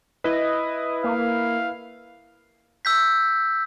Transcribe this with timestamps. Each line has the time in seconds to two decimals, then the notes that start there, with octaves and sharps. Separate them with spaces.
0.24 E4 B4 D#5
1.04 A#3 F5
2.85 E6 G6 B6